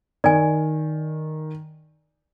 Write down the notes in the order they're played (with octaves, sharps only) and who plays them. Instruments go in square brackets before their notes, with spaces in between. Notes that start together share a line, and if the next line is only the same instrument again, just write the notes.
[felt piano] D#3 [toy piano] D5 G#5